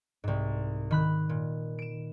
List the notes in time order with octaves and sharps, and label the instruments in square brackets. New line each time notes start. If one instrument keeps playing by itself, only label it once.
[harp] C2 G#2
D#3 B5 F#6
A#2
D7 E7